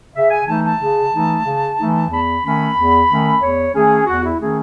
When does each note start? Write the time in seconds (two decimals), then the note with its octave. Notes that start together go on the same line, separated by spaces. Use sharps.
0.14 C#3 E5
0.30 G#5
0.46 E3 A3 D#4 A5
0.63 A5
0.79 C#3
1.12 E3 A3 D#4
1.45 C#3
1.77 E3 A3 D#4
2.10 E2 B5
2.43 D#3 A3 C#4 B5
2.76 E2
3.08 D#3 A3 C#4
3.41 E2 C#5
3.74 D#3 A3 C#4 G#4
4.06 E2 F#4
4.23 E4
4.39 D#3 A3 C#4 G#4